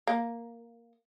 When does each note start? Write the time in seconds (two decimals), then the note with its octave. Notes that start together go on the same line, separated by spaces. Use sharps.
0.07 A#3